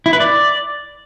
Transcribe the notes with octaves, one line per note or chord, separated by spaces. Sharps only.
E4
B4
D5